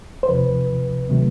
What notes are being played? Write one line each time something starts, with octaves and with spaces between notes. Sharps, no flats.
C5
E2 C3 F3 B4
C3 D#3 F#3 A3